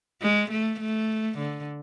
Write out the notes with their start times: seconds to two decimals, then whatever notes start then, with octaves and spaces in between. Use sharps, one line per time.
0.22 G#3
0.51 A3
0.80 A3
1.38 D3